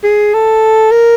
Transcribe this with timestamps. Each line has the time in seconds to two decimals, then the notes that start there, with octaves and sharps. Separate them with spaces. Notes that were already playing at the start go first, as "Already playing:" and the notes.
0.04 G#4
0.34 A4
0.91 A#4